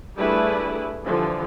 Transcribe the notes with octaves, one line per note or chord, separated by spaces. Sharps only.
G3 A3 D4 E4 G#4 B4
D3 E3 F3 G3